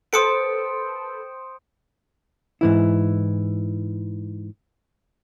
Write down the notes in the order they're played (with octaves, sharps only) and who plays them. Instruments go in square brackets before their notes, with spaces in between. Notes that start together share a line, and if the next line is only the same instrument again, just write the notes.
[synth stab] A4 B4 [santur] C5 G5 [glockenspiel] D#6 C#7 D7
[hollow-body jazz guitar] G#2 E3 E4